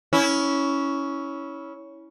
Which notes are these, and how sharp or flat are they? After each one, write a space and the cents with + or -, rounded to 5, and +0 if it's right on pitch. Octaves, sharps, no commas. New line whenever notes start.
C#4 +10 E4 -20